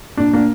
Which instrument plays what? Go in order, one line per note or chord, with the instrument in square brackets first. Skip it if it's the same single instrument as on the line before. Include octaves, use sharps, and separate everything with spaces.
[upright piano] A#2 D4
A#3 D4